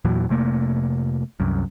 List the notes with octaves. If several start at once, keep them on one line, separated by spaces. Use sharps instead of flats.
E2 A#2 E3 F#3
F1 C3 A3 A#3
C2 F#2